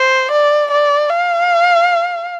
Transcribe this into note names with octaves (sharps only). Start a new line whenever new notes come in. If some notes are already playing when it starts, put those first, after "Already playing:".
Already playing: C5
D5
D5
F5